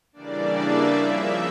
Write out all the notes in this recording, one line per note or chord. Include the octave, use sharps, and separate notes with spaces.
C#3 E3 G3 A#3 D4 D5
E5
C#3 F3 A#3 E5